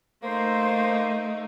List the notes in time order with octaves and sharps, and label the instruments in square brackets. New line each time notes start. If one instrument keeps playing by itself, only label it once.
[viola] A3 D#4 [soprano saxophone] A#3 [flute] C5